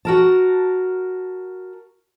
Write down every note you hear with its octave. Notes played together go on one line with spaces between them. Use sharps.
F#4 A#4 A5